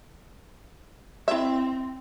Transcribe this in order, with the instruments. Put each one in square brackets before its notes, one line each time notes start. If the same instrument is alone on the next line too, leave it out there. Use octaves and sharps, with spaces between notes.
[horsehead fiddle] C4 [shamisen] E4 E5